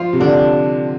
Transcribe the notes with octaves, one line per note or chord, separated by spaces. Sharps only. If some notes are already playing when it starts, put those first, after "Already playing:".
Already playing: F3 F4
C3
D3 D4